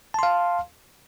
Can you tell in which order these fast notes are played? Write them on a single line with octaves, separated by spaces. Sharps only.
A5 C6 F5